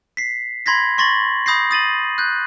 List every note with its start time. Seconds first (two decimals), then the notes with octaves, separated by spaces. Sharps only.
0.17 B6 C7
0.66 B5 C6 G#6 A#6 B6
0.98 C6 C#6 A6 A#6 F#7
1.46 B5 D#6 G6 A#6 C7
1.71 D#6 A6 D#7 F#7
2.18 F#6 G6